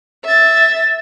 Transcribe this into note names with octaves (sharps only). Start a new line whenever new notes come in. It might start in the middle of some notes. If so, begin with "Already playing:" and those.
E5 A6